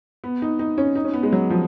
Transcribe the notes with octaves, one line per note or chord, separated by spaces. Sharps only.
B3
D#4
D#4
C#4
D#4
C#4
B3
G#3
F#3
F3